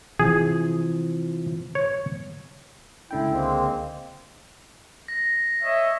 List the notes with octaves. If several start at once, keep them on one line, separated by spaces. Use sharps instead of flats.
C3 E3 F3 G#4
C#5
C#2 D3 E4 G5
G#3 A#3 C4
A#6
C#5 D#5 E5